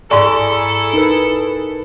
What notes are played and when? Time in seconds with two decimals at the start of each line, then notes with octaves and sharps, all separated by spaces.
0.11 G#2 E4 G#4 A4 D5 G#5 A#5 C#6
0.93 D#4 A#4 B4